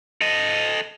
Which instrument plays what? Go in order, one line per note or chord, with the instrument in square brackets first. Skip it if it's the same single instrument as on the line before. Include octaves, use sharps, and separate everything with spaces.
[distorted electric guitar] A4 D#5